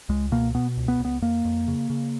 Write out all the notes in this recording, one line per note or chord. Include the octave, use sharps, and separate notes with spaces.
C#2 G#3
B2 A#3
B2 B3
C#2
B3
C#2
B3
F2 A#3
F2
C#3
C#3